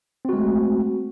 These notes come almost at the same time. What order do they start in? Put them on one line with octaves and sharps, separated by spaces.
C4 F#4 G#3 A3